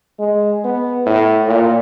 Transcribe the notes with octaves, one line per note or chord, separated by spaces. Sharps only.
G#3
B3
A2
A#2